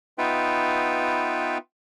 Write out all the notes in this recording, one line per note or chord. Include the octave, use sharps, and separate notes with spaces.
B3 D#4 F4 B4 E5 G5